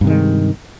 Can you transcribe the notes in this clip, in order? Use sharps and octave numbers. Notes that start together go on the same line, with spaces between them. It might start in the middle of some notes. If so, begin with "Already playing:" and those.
G2 C3 D#3 G#3